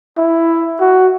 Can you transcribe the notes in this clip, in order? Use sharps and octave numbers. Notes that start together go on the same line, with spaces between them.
E4
F#4